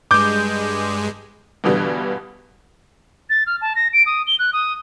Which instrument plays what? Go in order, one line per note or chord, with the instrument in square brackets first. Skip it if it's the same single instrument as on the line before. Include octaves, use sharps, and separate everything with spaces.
[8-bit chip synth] G2 G#3 [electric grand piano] D6 G6
[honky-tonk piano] G2 B2 D3 E3 G3
[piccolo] A6
F6
A5
A#6
D7
D#6
G7
F#6
D#6